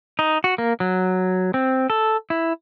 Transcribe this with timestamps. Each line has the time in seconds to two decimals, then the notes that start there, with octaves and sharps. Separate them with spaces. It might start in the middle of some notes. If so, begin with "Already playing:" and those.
0.19 D#4
0.44 F#4
0.58 A#3
0.80 F#3
1.54 C4
1.90 A4
2.30 E4